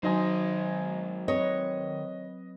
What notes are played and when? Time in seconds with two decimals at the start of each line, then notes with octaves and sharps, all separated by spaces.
0.03 D#3 F#3 D#4 C5 D#5 G#5
1.28 C4 B4 C#5 D#5